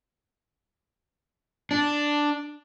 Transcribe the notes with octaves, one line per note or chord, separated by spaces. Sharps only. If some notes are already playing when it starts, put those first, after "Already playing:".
D4